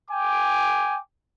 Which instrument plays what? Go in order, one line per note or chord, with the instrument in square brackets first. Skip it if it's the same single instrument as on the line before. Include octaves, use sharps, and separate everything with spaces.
[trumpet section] G5 G#5 D6